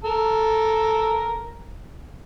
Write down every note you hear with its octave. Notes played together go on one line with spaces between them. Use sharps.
A4 A#4